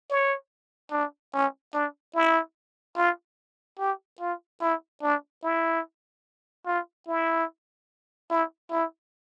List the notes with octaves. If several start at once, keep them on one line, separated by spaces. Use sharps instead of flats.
C#5
D4
C#4
D4
E4
F4
G4
F4
E4
D4
E4
F4
E4
E4
E4